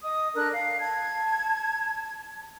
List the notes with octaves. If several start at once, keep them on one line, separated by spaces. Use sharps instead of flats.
D#5 D#6
D4 A4 A#4 F#6
F5
A5 G#6